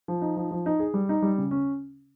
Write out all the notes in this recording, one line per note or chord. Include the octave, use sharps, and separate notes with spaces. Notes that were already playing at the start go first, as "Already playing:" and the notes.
F3
D#4
F3
F3
D#4
G#4
G3
D#4
G3
C#3
C#4